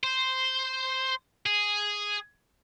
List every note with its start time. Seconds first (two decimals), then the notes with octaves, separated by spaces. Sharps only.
0.04 C5
1.46 G#4